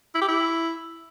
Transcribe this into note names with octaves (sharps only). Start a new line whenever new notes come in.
E4
G4
E4